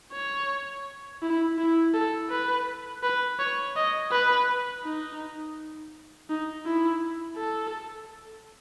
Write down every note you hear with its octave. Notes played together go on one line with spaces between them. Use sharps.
C#5
E4
E4
A4
B4
B4
C#5
D#5
B4
D#4
D#4
E4
A4